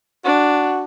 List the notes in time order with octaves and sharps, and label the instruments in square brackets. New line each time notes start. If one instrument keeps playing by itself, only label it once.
[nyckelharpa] D4 [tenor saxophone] F#4